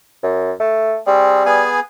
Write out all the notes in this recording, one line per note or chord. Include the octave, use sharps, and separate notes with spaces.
F#2
A3
G3 C4 G#4
B3 G#4 G#5